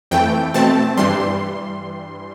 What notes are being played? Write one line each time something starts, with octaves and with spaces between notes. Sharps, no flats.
F2 E3 A3 G5
B2 A3 C4 A5
G2 E3 G3 C6